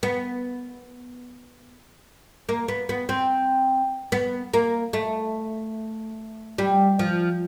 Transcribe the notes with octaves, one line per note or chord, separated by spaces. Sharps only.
B3
A#3
B3
B3
C4
B3
A#3
A3
G3
F3